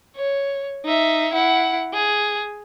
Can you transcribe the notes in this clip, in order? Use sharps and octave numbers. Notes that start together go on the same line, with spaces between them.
C#5
D#4 E5
E4 F#5
G#4